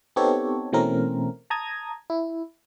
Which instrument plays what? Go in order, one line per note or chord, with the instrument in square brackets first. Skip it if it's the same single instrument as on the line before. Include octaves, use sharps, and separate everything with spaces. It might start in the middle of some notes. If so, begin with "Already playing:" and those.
[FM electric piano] B3 C4 D#4 G4 A4 C#5
B2 E3 A3 C4 C#4 A#4
A5 A#5 D#6 G#6
E4